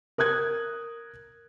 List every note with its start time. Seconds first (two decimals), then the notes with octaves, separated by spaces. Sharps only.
0.18 A#4 D#6 F#6 G#6